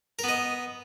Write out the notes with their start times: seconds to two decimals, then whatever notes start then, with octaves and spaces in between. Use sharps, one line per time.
0.19 A#4
0.24 B3
0.29 D#5